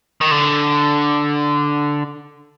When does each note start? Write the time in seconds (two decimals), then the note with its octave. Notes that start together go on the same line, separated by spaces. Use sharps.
0.21 D#3
0.31 D3